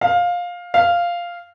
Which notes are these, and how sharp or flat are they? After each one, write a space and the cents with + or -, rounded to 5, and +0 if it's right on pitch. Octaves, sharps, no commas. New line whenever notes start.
F5 +15
F5 -5